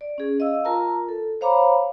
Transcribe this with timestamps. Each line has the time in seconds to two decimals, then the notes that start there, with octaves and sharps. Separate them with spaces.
0.01 D5
0.18 C#4 G#4
0.40 D#5 F5 E6
0.65 F4 A#4 A5 A#5
1.08 A4
1.41 C5 C#5 F5 A#5 B5 D6